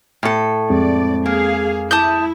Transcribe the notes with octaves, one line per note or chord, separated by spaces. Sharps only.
A2 A4
F2 G#3 C4 D5
A#3 G#4 F5
E4 A5 D#6 G6